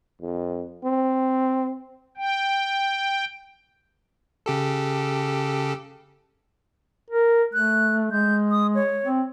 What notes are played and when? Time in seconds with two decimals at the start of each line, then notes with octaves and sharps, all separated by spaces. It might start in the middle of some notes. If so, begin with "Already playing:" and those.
0.21 F2
0.84 C4
2.17 G5
4.46 C#3 G4 A4
7.10 A#4
7.53 A3 F#6
8.11 G#3 G6
8.51 D#6
8.75 C#5
9.05 C4